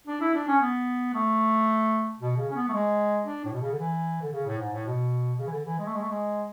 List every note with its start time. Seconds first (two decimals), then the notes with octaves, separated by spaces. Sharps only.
0.07 D4
0.21 E4
0.34 D4
0.48 C#4
0.61 B3
1.14 A3
2.20 B2
2.37 C#3
2.50 C#4
2.55 B3
2.68 A3
2.73 G#3
3.26 D4
3.45 A2
3.52 B2
3.61 C#3
3.71 D3
3.79 E3
4.21 D3
4.32 C#3
4.46 A2
4.59 G#2
4.73 A2
4.86 B2
5.39 C#3
5.47 E3
5.51 D3
5.65 E3
5.79 G#3
5.86 A3
5.94 G#3
6.01 A3
6.09 G#3